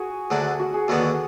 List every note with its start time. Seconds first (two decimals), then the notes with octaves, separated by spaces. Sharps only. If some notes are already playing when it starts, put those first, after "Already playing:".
Already playing: F#4 G#4
0.30 D2 D3 F#3 D4 G#4
0.59 F#4
0.74 G#4
0.88 D#2 D3 F#3 B3 D4 F#4
1.03 F#4